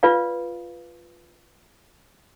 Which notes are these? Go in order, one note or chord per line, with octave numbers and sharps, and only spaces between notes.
F4 B4 D5 F5